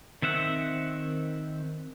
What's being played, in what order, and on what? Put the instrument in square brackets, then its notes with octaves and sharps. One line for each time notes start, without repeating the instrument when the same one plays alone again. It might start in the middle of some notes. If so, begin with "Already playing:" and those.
[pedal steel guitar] D#3 C4 E5 F#5